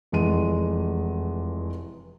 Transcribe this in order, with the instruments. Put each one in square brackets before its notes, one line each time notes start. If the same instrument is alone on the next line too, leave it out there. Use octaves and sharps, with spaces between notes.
[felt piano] F1 E2 G#3 D#7